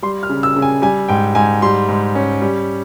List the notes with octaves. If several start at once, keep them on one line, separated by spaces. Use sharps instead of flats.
G3 C6
F6
C#3
E6
C#3
G#5
G3 G#5
G#2 G5
G#2 G#5
G3 C6
G#2
C#4
G3